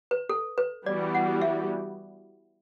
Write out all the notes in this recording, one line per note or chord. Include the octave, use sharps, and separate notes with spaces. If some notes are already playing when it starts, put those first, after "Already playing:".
B4
A4
B4
E3 G3 B3 F#4 D5
F#5
E5